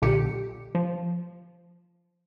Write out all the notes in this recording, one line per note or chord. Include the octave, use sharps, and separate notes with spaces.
B1 A#2 D3 G4 C#7
F3